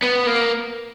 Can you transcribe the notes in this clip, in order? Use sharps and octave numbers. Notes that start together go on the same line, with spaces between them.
B3
A#3